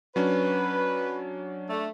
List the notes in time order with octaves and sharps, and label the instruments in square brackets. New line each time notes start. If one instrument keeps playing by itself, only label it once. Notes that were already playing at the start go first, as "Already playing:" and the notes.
[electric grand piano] F#3 C#4 D4 [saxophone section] B4
[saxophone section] A3 D4